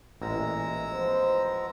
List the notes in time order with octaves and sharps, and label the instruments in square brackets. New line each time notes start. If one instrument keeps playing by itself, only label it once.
[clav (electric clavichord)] A1 [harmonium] A#2 E3 [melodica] G#3 A#5 E6
[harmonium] F3 B3 [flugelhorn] C5